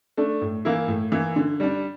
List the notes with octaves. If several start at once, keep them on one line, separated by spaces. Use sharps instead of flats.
A3 D4
A2
E3 A#3 E4
A2
E3 A#3 E4
D3
G3 D4